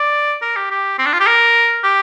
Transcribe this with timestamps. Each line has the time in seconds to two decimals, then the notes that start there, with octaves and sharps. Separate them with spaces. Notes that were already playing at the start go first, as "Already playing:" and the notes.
Already playing: D5
0.42 A#4
0.56 G4
0.70 G4
0.98 C4
1.06 D4
1.13 F4
1.20 G4
1.27 A#4
1.84 G4